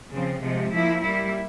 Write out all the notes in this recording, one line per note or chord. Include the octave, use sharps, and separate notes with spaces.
C#3 F3 C4
C3 F3 G#3
F3 A#3 E4
G3 A#3 E4